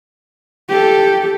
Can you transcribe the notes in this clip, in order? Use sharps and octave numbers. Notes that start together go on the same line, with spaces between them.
G4 A4